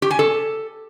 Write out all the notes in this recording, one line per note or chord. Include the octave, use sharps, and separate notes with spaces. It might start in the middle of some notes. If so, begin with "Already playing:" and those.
G4
G#5
A4